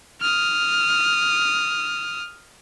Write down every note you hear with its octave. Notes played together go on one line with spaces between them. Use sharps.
D#6 F6